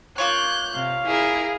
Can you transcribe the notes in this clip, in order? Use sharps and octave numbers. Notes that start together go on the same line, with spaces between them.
A#3 F4 C#5 F#6 G6
C3 F5
E4 G#4 A#4